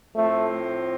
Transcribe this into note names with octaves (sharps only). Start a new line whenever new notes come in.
A2 F3 A3 C4